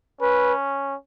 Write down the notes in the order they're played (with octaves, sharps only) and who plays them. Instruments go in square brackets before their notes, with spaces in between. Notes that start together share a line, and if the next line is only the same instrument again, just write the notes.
[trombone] C#4 [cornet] B4